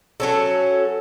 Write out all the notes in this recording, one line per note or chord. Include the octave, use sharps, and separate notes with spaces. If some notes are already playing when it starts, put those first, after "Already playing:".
F#3 C#4 A4